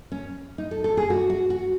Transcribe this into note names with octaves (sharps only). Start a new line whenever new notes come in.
C#4
D#4
A4
A4
G#4
F#4
F#4
F#4